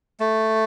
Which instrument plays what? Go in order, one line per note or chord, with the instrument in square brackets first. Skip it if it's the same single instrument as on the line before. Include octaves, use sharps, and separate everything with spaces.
[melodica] A3